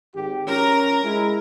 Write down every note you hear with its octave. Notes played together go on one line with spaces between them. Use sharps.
G#1 G4
C#4 A#4 A#5
G#3 E4